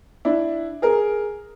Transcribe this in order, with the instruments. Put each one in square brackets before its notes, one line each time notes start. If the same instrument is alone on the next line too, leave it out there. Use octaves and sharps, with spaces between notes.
[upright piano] D4 E4
G#4 A#4